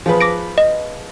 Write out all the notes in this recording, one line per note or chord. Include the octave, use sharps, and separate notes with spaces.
F3 G#4 B4
D6 A#6 D7
D#5